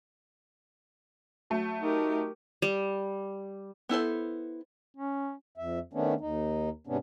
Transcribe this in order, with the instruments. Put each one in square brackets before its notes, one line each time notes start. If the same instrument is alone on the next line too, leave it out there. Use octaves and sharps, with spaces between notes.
[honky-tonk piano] F#3 A3
[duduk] D#4 [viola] G4 A#4
[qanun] G3
[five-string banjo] B3 E4 A4 C5
[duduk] C#4
[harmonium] F2 E5
D#3 A3 B3 C#4 D4
D#2 D#4
G#2 C3 B3 C#4 D4